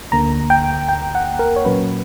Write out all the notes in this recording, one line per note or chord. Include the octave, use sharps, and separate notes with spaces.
D2 D3 A#3 A#5
G5
G5
F#5
A#4
C#5
A#2 F#3 A#3 C#4 B4